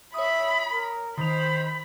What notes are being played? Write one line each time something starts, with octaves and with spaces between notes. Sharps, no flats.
C#5 E5 B5 D#6
A#4
D#3 C5 B5 F7